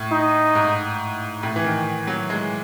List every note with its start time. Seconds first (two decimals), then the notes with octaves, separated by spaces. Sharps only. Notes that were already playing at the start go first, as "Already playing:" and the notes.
Already playing: A2
0.12 D#4
0.55 G#2
1.43 A2
1.56 E3
1.64 D#3
2.07 F#3
2.30 G#3